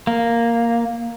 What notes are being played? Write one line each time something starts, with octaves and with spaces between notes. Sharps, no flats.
A#3